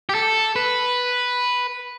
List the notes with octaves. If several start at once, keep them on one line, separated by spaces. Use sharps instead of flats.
G4
A4
B4